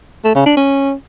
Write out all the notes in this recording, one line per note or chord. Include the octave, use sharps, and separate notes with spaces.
A3
C#3
D4
C#4